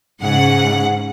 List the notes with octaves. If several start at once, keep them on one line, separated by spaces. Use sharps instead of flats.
G#2 C#3 F#5